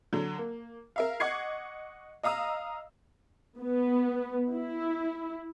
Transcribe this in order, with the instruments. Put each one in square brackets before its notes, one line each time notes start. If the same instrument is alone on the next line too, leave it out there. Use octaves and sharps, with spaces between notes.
[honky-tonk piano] D3 F#3
A#3
A#4 E5 F5
D#5 F#5 C#6 D6 G#6 C7
D#5 F5 A#5 D#6 E6
[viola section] B3
E4